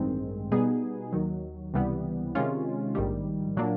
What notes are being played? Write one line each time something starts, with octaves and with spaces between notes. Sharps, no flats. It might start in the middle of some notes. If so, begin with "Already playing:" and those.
Already playing: A1 G2 D#3 G#3 C4
B2 G3 B3 D#4 G#4
D#2 D#3 F#3
C#2 C3 E3 G3 B3
C3 D#3 G#3 C#4 F4
A#1 G#2 D#3 G3
A#2 F#3 A#3 D4